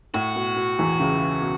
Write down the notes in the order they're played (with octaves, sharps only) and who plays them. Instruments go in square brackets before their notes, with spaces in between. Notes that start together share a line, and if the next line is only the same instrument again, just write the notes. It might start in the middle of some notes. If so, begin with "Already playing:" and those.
[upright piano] A2 [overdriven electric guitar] F#4
[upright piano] B2
B2
E2 E3
C#2 C#3
B2